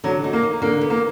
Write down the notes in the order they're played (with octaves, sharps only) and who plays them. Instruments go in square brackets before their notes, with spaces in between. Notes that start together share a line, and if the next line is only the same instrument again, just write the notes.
[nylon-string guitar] D3 [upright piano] F#3
[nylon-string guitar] D#4
[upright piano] A#3
[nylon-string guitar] D#4
[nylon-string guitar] D3 [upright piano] A#3
[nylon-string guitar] B3
[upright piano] A#3